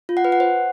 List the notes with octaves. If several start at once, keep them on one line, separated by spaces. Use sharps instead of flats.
F4
F#5
B4
F#5
C5